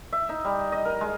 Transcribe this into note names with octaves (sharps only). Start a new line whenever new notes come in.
E5
D#4
G3
D#5
A#4
G#3